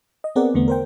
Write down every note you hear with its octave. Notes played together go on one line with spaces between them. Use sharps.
D#5
B3 C4 G#4 A#4 D5 F#5
E2 D3 A3 B3
A#4 C5 G5